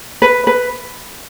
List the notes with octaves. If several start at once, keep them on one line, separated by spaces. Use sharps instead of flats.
B4
B4